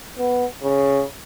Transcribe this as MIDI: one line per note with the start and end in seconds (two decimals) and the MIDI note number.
0.18 0.45 59
0.63 1.03 49